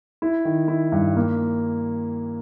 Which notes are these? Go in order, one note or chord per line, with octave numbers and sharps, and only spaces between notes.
E4
D#3
E4
G2
A#3